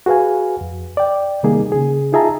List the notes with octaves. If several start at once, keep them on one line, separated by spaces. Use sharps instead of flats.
F#4 G#4 B4 F5 G#5
F2
D5 G5
C3 D#3 G3 A#3 D#4 G#4
C#3 G#4
D#4 F4 G#4 E5 A5 A#5